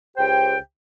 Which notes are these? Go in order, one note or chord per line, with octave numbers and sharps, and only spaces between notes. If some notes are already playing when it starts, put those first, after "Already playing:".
C#2 G4 C5 G5